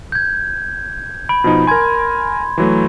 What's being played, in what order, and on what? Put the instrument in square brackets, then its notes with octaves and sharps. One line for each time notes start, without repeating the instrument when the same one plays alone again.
[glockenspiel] G6 G#6
[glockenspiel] B5 [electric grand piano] D7
[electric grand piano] B2 F3 D#4
[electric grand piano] A#4 G#5 [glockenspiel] C6 G#6
[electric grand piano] E3 F#3 A3